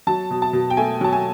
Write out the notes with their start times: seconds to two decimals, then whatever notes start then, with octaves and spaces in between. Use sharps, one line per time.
0.07 F#3 A5
0.31 B2
0.42 A5
0.53 B2
0.70 G5
0.77 A3 G#5
1.01 F#3 A5
1.13 G#5